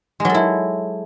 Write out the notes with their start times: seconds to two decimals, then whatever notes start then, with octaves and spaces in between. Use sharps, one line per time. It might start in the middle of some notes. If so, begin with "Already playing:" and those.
0.20 G#3
0.25 F#3
0.30 A4
0.34 E4